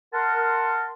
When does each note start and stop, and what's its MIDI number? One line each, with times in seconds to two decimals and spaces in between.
0.13 0.92 70
0.13 0.92 78
0.13 0.92 81
0.13 0.92 84